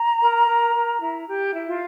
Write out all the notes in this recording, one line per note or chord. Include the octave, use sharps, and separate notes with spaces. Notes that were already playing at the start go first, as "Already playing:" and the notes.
Already playing: A#5
A#4
A#4
A#4
E4
G4
E4
F4 F5